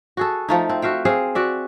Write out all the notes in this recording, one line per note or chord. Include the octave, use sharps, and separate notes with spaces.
F#4 G#4 A4
F3 A3 D#4
C4
F#4 E5 F5 G5
C4 G#4 F5
F#4 D5 E5